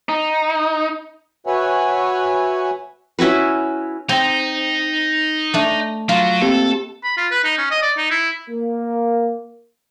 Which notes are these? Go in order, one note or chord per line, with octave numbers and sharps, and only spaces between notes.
D#4
F#4 B4 C#5 E5 F#5 G#5
C#4 E4 F#4 B4
C4 D#4
A3 D4
F#3 F4
A#3 C4 G4 A4
B5
F4
B4
D#4
C#4
D#5
D5
D#4
E4
A#3